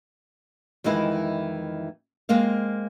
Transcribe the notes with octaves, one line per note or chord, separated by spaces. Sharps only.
F2 D#3 E3 G#3 E4
G#3 A#3 C4 F5